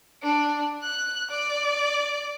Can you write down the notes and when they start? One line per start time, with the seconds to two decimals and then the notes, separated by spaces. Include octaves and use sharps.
0.23 D4
0.83 F#6
1.31 D5